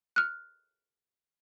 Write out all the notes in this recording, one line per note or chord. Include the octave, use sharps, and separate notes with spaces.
F6 F#6